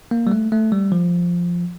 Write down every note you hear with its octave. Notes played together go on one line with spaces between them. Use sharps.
A#3
G3
A3
A3
G3
F3